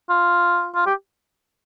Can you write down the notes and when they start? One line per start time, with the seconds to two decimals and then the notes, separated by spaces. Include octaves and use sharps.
0.09 F4
0.75 F4
0.86 G4